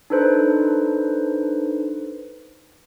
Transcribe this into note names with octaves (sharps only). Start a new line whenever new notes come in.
D4 D#4 A4 B4 C5